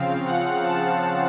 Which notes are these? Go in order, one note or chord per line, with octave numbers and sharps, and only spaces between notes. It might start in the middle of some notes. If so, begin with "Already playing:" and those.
Already playing: C#3 F3 C4 F5
F#5
A5